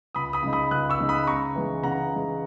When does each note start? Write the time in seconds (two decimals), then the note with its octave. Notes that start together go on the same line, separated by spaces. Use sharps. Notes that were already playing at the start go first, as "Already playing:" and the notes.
0.15 C#2 B5 D#6
0.33 B5 D#6
0.43 C#3 G#3 D#4
0.53 B5 D#6
0.71 C#2 D#6 F#6
0.90 C#6 E6
0.99 C#3 G#3 D#4
1.09 B5 D#6
1.27 C#3 A#5 C#6
1.55 E3 G#3
1.83 C#3 F#5 A#5
2.11 E3 G#3